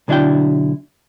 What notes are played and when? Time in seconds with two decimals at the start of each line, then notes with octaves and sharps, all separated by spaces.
0.08 B1 D3 D4 E4 F#4 G5